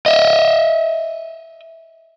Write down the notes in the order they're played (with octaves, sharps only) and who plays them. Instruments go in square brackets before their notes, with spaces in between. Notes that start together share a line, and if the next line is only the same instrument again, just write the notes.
[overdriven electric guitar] D#5 E5